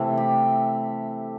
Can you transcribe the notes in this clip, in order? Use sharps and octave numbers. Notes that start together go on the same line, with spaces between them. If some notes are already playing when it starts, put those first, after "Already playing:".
Already playing: C3 E3 A3
G4